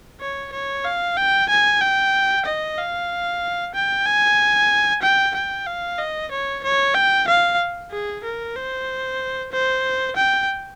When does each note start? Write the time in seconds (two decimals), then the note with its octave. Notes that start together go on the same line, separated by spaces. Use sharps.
0.21 C#5
0.53 C#5
0.85 F5
1.17 G5
1.50 G#5
1.81 G5
2.46 D#5
2.78 F5
3.75 G5
4.06 G#5
5.02 G5
5.35 G5
5.67 F5
5.99 D#5
6.32 C#5
6.64 C#5
6.95 G5
7.28 F5
7.92 G#4
8.24 A#4
8.56 C5
9.52 C5
10.17 G5